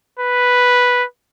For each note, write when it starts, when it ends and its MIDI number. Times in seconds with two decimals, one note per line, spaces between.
0.19 1.04 71